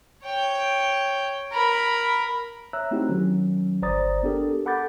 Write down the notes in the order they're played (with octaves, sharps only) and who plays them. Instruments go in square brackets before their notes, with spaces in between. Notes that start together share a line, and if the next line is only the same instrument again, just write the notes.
[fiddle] C#5 G5
A#4 B5
[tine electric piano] C#5 E5 A#5 E6 F#6
A3 C4 D#4 E4 F#4 G4
D#3 F#3 C#4
G1 C5 D5 A#5 D#6 A6
B3 D4 G4 A4 A#4
A4 F#5 B5 D6 G6 A6